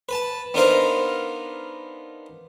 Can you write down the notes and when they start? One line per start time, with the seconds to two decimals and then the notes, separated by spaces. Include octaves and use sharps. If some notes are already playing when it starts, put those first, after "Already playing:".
0.09 B4 A5
0.54 B3 D4 D#4 A#4 C5 F5